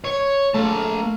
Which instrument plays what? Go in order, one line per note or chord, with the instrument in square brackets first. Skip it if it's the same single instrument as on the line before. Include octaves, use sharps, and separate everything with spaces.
[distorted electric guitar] C#5
[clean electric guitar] A3 [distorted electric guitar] A#3 A5